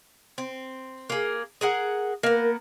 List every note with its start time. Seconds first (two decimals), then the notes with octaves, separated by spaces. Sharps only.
0.38 C4
1.10 A#3 G#4
1.61 G#4 A#4 F#5
2.23 A#3 B3 A#4